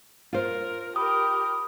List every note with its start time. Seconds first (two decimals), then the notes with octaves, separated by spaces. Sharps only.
0.33 F4 A#4 C5
0.96 G4 A#4 B5 D#6